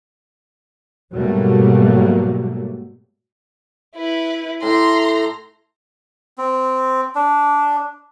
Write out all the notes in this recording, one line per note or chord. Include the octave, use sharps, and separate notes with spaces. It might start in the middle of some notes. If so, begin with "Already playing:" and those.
G#2 B2 F#3 G3 A3 A#3
E4 B4
A2 A#5 C6
C4
D4